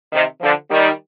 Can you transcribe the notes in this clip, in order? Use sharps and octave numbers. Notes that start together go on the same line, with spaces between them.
C3 D#3
D3 F3
D#3 G3